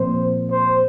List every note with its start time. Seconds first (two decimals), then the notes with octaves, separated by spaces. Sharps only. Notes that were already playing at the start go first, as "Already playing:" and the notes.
Already playing: A#2 F3 C4 C5
0.51 C5